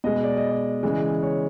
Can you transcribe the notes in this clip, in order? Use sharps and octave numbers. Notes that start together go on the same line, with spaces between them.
B2 G#3 D#5
D5
D#5
D5
C#3 E3 G#3
C#5